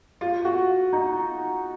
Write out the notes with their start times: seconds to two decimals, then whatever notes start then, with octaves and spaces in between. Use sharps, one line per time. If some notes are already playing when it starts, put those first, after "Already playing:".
0.21 F4
0.45 F#4
0.93 D#4